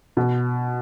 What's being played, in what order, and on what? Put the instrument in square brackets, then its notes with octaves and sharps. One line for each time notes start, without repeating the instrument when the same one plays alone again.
[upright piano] B2